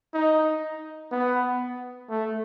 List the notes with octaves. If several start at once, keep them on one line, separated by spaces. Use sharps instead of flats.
D#4
B3
A3